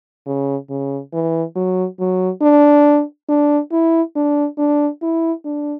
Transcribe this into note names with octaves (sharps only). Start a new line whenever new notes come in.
C#3
C#3
E3
F#3
F#3
D4
D4
E4
D4
D4
E4
D4